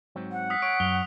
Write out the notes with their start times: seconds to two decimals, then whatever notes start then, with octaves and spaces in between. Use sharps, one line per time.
0.16 G#2 F#3 C4
0.32 F#5
0.50 D#6 E6 B6
0.62 C#5 D7
0.80 F#2 F7 G7